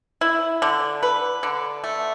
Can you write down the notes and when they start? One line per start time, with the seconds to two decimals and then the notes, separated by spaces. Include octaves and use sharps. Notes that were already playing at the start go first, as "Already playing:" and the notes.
0.21 E4
0.62 D3
1.03 B4
1.43 D3
1.84 A3